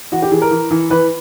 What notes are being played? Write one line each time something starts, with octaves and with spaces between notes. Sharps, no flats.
E3 F#4
G4
E3 G#4
A#4
E3
E3
E3 B4